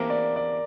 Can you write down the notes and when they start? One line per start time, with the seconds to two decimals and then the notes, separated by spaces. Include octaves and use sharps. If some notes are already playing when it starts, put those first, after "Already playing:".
Already playing: E2 C3 E3 A#3 D4 A#4
0.10 D5
0.36 D5